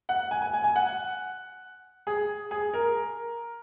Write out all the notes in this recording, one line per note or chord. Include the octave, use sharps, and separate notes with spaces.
F#5
G#5
G#5
G#5
G#5
F#5
G#4
G#4
A#4